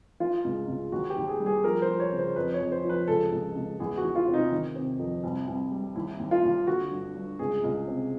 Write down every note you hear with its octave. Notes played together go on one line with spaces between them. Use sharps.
E3 F4
C#2
C#2
D#2 F#4
G4
D#2
G#4
G3
G#4
F3 A#4
C5
F3
C#5
C#3
C5
F2 B4
C#5
F2
C5
F3
B4
C#2 A4
C#2
C#2
E2 G#4
F#4
E3
F4
C3
D#4
D#3
C3
F2
C2
C2
G3
D#2 E4
D#2
F4
D#2
D3 F#4
G2
G2
C#2 G#4
C#2
C3